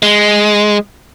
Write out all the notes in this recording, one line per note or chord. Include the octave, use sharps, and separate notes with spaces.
G#3